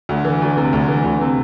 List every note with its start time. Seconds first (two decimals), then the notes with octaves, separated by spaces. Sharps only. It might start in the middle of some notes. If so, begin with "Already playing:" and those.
0.09 D2
0.25 E3
0.42 D2
0.57 C3
0.73 D2
0.88 E3
1.04 D2
1.21 C3